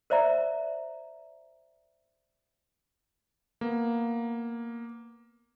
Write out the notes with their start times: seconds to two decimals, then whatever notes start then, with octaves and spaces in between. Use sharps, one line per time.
0.10 A#4 C5 D5 E5 A#5
3.61 A#3 B3